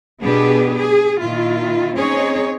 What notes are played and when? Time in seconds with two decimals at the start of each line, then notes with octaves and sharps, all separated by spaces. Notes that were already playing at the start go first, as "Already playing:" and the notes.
0.22 B2 B3 D4 G4 G#4 B4
0.77 G#4
1.21 A#2 D#3 E4 F4
1.97 C4 C#4 D#4 G#4 C#5